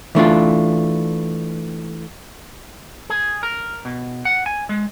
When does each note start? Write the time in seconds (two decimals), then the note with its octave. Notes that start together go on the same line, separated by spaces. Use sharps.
0.15 E3 A3 D4 F4
3.10 G#4
3.43 A#4
3.85 B2
4.25 F#5
4.46 G#5
4.69 G#3